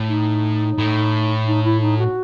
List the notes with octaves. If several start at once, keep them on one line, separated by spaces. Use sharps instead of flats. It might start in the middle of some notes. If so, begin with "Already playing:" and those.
Already playing: A2
D#4
A2
D#4
E4
D#4
F#4